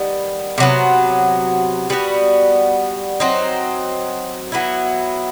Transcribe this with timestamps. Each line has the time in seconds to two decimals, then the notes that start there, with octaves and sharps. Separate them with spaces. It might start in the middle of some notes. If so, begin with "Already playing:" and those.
Already playing: D#3 G3 B3
0.58 C3 F#3 B3
1.90 G3 B3 D#4 F#4
3.20 F#3 C4 D#4
4.52 F#3 B3 E4